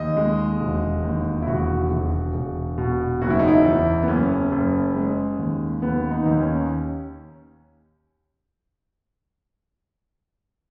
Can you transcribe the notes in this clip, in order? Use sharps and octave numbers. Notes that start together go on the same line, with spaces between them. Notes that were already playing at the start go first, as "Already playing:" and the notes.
Already playing: D#2 D#5
G#3
E1
D#2
E4
E1 F#4
E1
E1
B2
F#1 F#4
E4
D#4
E4
E2
B3
F#1 C#4
F#1
G#3
D#2
D#2 B3
D#4
D#2
C#4